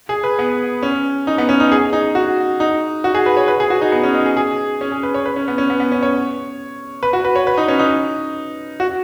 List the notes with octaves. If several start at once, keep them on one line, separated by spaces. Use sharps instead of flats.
G#4
B4
B3
C#4
D#4
B3
C#4
D#4
G#4
D#4
F#4
D#4
F#4
G#4
B4
C#5
B4
G#4
F#4
D#4
B3
C#4
D#4
G#4
G#4
C#4
G#4
B4
C#5
B4
C#4
B3
C#4
B3
B3
C#4
C#5
B4
F#4
B4
C#5
B4
D#4
C#4
D#4
F#4